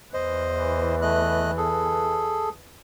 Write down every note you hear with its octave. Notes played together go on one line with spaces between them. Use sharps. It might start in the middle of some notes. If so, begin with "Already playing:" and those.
E2 E3 C5 D#5
A3 D#5 F#6
G#4 A4